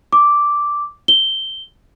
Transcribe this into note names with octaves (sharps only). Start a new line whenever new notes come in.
D6
G7